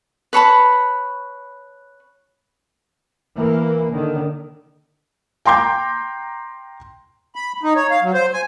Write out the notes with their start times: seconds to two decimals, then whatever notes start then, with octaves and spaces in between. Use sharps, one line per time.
0.33 B4 C#5 A5 B5
3.36 E3 A#3
3.91 D3 D#3
5.45 G5 A#5 C6 D6 G6
7.35 B5
7.63 D#4
7.76 C#5
7.90 F5
8.03 F#3
8.14 C5
8.33 G#5